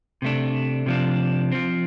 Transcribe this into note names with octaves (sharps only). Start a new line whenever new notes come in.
C3 A3 D4
C3 F3 D4
F3 C4